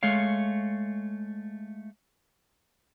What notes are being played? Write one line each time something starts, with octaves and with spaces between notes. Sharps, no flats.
G#3 A3 C#5 F5